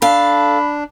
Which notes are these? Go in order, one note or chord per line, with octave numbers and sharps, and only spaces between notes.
D4 A4 F5 B5